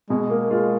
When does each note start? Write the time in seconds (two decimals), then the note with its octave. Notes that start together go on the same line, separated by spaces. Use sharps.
0.10 B2 G#3
0.30 A#3
0.51 G#3 F4